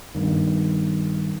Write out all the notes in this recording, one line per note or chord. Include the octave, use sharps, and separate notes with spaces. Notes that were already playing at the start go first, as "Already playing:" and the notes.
G2 D#3